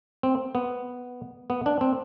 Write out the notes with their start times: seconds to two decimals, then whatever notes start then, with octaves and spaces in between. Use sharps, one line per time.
0.23 C4
0.55 B3
1.50 B3
1.66 D4
1.81 C4